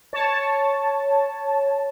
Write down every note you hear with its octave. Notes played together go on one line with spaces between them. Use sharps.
C#5 A5